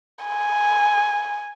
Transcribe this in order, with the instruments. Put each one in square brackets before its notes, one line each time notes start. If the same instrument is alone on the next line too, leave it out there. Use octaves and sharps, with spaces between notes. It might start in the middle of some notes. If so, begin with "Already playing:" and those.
[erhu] G#5